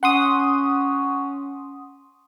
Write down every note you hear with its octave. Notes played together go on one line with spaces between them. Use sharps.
C#4 F#5 C6 D#6